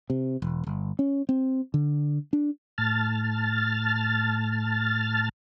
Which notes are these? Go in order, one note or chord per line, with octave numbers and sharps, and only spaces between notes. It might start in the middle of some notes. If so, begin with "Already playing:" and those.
C3
E1
G1
C#4
C4
D3
D4
A2 A5 F6 A6